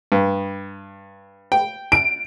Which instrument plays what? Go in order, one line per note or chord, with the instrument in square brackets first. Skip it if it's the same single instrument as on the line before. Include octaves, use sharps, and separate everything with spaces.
[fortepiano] G2
G5
[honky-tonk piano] D7